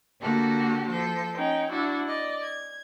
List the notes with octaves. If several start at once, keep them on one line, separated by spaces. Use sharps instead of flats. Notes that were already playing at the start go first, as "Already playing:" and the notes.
D3 A#3 F#4 G4 A4
F3 A4 G6
C#4 D#4 G5
D4 E4 F#4
D5 D#5
G#6